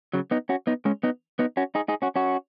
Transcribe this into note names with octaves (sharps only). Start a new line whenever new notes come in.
C#3 F#3
B3 D#4
C#4 F#4
B3 D#4
G#3 C#4
B3 D#4
B3 D#4
C#4 F#4
D#4 G#4
D#4 G#4
C#4 F#4
C#4 F#4